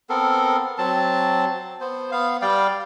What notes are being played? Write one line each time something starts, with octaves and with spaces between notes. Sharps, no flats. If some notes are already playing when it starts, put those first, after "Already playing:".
B3 C4 A4 A#4
F#3 C4 A5
B3 C5
B3 F5
G3 D5 F5 G5